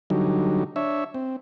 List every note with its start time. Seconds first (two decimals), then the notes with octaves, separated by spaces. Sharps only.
0.10 D3 F#3 G3 D#4
0.76 D4 C#5 E5
1.14 C4